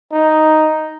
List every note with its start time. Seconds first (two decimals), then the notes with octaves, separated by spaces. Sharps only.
0.12 D#4